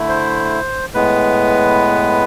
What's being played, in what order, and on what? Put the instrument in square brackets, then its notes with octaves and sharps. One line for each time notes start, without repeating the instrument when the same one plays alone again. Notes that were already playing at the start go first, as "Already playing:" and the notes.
Already playing: [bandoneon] D3 A3 E4
C5
A2 G#3 B3 B4